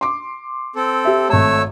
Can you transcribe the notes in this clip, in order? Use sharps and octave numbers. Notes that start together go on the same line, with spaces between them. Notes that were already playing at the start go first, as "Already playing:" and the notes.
C6 D6
C4 A4
G4 E5
G#1 A3 C#5 A5 E6